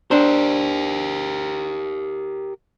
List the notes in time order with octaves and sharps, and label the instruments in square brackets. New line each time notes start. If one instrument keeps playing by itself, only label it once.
[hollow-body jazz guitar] D4 C5 [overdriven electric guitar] G4 A#4